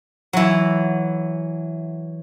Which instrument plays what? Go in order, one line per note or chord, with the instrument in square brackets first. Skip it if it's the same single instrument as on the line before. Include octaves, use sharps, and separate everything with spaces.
[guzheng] E3 F#3